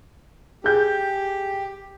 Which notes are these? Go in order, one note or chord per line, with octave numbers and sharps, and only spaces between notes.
G4 G#4 G6